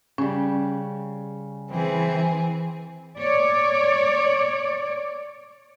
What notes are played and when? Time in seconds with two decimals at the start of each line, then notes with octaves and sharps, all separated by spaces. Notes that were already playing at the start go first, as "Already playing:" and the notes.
0.18 C#3 G3 C#4
1.71 E3 C4 G#4
3.18 C#5 D5